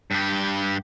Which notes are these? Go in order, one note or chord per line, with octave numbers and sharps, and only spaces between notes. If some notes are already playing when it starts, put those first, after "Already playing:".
G2 G4